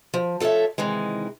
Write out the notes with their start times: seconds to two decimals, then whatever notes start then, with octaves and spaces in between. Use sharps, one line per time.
0.14 F3
0.40 F3 A4 A#4 C#5 E5
0.78 C3 D#3 E3 G#3